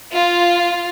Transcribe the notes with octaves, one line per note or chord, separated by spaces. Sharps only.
F4